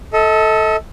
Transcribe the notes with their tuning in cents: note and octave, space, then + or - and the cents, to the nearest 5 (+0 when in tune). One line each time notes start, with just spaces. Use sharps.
A4 +0 D#5 +40